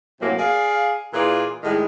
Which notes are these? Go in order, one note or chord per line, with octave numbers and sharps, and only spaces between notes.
F#2 A2 C3 F#3 A#3
G#4 D5 F5
A#2 E3 F4 G#4 D5
A2 D#3 G3 G#3